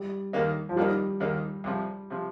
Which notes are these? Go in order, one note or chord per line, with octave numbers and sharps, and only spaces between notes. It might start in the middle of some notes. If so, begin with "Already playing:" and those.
Already playing: G3
D#2 D#3 A#3 D#4
F3
D#2 D#3 G3 A#3 D#4
D#2 D#3 A#3 D#4
C2 C3 F3
C3 F3